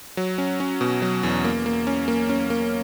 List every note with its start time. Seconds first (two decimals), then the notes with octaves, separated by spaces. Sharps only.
0.17 F#3
0.38 C#4
0.60 C#4
0.81 B2
1.02 F#3
1.23 E2
1.44 A#3
1.66 A#3
1.87 C#4
2.08 A#3
2.29 C#4
2.50 A#3